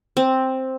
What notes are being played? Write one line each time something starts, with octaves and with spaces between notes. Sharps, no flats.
C4